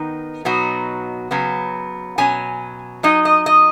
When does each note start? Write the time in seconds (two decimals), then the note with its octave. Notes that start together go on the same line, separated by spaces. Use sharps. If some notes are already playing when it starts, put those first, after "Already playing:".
Already playing: D#3 B3 D#4
0.45 B2 F#3 B3 D#4 F#4
1.31 C#3 F#3 B3
2.18 B2 F#3 C#4 G#5
3.03 F#3 D#4 D#5
3.25 D#5
3.46 D#5